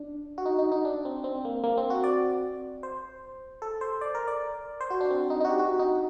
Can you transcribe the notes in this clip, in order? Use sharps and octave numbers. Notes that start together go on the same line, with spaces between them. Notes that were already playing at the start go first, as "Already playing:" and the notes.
Already playing: D4
F#4
D#4
D#4
D#4
D4
C4
C4
A#3
A#3
C4
F#4
D5
C5
A4
C5
D5
A#4
D5
C5
F#4
D4
C4
D#4
D#4
F#4
G4
F#4
D#4